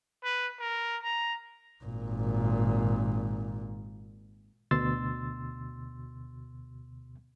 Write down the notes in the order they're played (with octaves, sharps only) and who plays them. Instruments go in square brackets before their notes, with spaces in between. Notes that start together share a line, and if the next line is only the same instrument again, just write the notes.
[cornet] B4
A#4
A#5
[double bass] G#1 A#2
[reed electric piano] D2 B2 C6 E6 A6